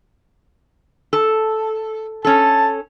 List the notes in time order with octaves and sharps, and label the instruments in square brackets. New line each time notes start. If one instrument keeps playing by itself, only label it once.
[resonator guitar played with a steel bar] A4
[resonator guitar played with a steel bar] C#4 A4 [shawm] A5